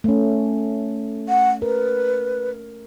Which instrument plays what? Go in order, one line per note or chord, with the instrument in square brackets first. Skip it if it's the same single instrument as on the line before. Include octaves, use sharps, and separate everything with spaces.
[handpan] A3 C#4
[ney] F#5
[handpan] A#4 [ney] B4